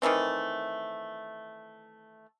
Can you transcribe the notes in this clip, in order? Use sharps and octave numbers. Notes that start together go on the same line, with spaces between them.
D#3 E3 A3 C4